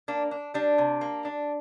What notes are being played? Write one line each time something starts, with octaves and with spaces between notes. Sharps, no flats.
A#3 D4
D4
G3 D4
C3
A#3
D4